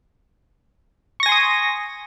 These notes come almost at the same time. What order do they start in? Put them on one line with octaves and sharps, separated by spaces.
C#6 A#6 G#5 C6 D#6